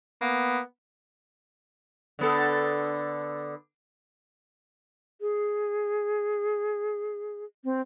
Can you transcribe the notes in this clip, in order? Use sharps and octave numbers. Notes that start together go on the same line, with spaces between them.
A#3 B3
D3 B3 A4
G#4
C4